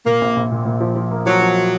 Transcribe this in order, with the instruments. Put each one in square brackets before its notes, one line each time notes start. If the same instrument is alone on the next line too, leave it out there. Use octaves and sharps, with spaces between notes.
[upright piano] A#2 [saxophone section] A#3
[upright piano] A#1
A#1
A#2
A#2
F3
F3
A#3
[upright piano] F3 [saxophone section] F#3
[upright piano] F3